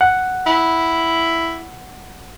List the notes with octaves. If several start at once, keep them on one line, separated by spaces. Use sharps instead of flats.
F#5
E4